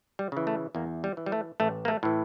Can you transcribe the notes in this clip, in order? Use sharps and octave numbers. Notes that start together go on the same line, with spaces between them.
G3
C#3 E3
A3
E2 A#3
G3
E3
G3
A3
A1 A3
A#3
A3
A2 E3